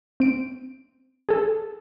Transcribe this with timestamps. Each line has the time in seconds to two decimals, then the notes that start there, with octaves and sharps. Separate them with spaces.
0.20 C4 D7
1.29 G#4 A4